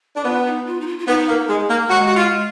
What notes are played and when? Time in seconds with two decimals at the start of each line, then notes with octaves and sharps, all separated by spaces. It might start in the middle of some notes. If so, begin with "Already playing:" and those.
0.16 D4
0.25 B3 F4
0.46 D#4
0.66 F4
0.81 D#4
0.87 F4
0.99 F4
1.07 B3 D#4
1.28 A#3
1.49 G#3
1.70 A#3
1.89 G#3 F#4
2.07 F#4
2.16 F4